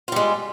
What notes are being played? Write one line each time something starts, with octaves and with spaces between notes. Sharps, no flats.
G3 G#3 F4